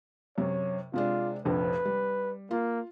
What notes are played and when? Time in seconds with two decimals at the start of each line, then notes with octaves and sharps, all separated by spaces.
0.38 F#2 C3 C#5
0.94 C3 G#3 D4 F4
1.45 F1 A#1 F2 B4
1.85 G3
2.51 A#3 F4